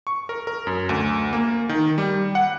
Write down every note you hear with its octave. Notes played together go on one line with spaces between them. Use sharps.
C#6
A#4
A#4
F#2
D2
A#3
D#3
G3
F#5